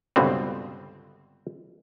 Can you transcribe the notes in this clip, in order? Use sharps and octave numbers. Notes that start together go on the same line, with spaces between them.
G1 C#2 B2 D3 C4